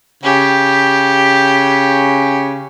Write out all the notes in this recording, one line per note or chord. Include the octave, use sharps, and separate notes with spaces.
C#3 G4